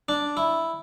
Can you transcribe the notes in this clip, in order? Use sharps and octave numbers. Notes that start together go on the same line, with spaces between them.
D4
E4